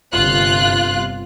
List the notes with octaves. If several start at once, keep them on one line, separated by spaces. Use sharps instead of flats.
G1 C3 F4 F#6